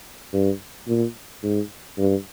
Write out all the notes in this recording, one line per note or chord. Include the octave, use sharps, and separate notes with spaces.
G2
A#2
G#2
G2